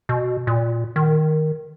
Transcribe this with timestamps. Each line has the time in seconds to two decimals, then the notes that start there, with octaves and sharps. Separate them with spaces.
0.09 B2
0.47 A#2
0.96 D#3